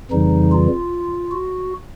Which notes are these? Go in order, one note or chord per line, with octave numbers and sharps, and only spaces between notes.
F2 C#3 E3 G3 D#4
F4
F#4